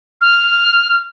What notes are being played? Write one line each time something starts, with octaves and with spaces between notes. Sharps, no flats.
F6